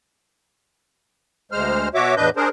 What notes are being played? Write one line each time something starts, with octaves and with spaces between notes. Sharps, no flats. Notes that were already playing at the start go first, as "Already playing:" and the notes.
D2 G#3 C5 F6
B2 F#4 C#5 E5 D6
E2 A2 D4 B4 D#5 G6
D4 G#4 A#4 C5